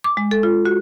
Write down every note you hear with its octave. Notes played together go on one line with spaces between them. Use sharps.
D6
G#3
A4
F4
F#4